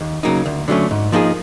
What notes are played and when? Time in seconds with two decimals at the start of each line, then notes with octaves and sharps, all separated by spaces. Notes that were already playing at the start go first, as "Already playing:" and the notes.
0.01 D#2
0.23 C#3 F#3 A#3 D#4
0.46 D2
0.68 D3 F#3 A3 C#4
0.91 G#2
1.12 F3 A#3 D#4 G#4